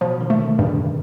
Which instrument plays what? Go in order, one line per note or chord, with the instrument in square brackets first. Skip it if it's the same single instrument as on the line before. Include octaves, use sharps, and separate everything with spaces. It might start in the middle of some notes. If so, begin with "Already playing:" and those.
[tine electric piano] B2 [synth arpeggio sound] F3
[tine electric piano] D#3
[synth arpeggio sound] A3
[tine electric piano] D3
[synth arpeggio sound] G2 [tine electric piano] C#3